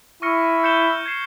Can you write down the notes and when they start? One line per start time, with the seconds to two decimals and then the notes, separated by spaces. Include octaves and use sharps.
0.22 E4 C#6 F6 A#6 C#7
0.64 G6 C#7 E7 G7
1.06 G#6 C7 E7